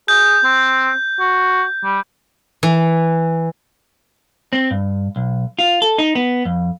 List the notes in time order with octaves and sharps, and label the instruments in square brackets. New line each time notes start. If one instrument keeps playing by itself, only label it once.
[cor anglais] G#4 [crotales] G6
[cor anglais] C4
F#4
G3
[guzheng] E3
[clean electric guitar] C4
G2
B1
F4
A4
D#4
B3
F2